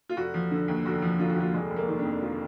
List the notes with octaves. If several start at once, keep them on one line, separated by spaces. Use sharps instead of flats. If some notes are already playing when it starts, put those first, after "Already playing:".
F4
F1 F#4
F3
D3
D#2
F1 F#4
F3
D3 F4
F#4
D#2 F4
F1 G#3
F1
A#3
D#3
D4
F2
F4